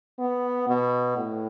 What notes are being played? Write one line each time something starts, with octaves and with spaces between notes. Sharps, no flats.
B3
B2
A2